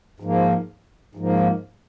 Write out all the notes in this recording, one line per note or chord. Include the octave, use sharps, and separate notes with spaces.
G#2 F3 A#3
G#2 F3 A#3